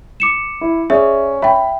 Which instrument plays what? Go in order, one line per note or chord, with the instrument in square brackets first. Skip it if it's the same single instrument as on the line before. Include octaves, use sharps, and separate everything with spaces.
[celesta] D6 C#7 E7
[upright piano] E4
[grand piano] C#4 [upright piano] G#4 D5 [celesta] E5
[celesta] E5 G5 [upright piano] B5